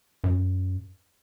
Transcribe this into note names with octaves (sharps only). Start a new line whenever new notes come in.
F#2